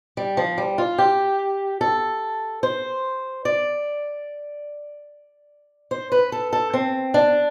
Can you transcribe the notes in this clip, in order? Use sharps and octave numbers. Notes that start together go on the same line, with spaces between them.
G3
F3
G3
F4
G4
A4
C5
D5
C5
B4
A4
A4
C4
D4